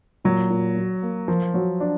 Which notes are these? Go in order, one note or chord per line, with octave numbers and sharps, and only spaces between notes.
A#2 F#3
A#2
F#3
A#3
F3 A#4
F#3
D4